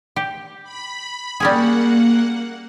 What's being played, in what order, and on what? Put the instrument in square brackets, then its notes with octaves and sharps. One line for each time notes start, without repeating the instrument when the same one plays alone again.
[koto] G4
[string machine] B5
[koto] G3 C#4 G#4 [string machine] A#3 F#5